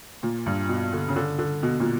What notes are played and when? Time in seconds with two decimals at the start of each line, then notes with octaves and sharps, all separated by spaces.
0.23 A#2
0.46 G2
0.69 B2
0.92 D3
1.08 C#3
1.16 D3
1.39 D3
1.63 B2
1.80 A#2